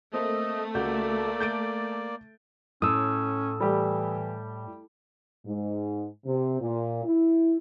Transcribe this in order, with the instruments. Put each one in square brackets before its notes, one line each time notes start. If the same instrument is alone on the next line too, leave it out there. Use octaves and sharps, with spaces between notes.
[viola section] A3 [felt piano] A#3 C4 [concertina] D#5
[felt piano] C#2 F#4 G6 [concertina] A#3 D5
[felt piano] G6 A6 D7
[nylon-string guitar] A2 [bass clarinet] C#4 [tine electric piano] D#6 E6
[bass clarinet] E3 [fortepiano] G3 A3 G4
[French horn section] G#2
C3
A#2
E4